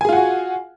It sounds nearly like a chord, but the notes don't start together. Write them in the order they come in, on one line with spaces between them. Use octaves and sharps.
G#5 G#4 F4 F#5 F#4